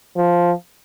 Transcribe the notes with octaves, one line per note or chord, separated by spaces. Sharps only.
F3